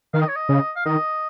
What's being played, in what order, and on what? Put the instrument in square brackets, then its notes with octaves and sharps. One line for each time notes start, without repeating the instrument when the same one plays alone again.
[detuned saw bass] D#3 [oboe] F5
[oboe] D#5
C#5
D#5
[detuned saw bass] C#3
[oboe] F5
[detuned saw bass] D#3 [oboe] D#5